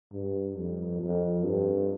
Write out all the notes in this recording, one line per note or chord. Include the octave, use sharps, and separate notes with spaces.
G2
F2
F2
G2